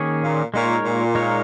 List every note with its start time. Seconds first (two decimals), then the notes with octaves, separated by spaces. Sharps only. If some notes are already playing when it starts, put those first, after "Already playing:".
Already playing: D#3 A#3 C#4 G#4 C#5
0.23 A#2
0.54 A#2 G#3 D#4 A#4 C#5
0.85 A#2
1.15 G#3 D#4 A#4 C#5